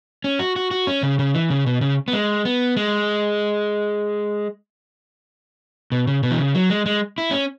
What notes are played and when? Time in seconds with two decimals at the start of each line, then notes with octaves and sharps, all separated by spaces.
0.24 C#4
0.39 F#4
0.56 F#4
0.71 F#4
0.87 C#4
1.03 C#3
1.19 C#3
1.34 E3
1.50 C#3
1.66 B2
1.81 C#3
2.08 B3
2.13 G#3
2.45 B3
2.77 G#3
5.92 B2
6.07 C#3
6.23 B2
6.31 E3
6.39 C#3
6.55 F#3
6.70 G#3
6.86 G#3
7.18 E4
7.31 C#4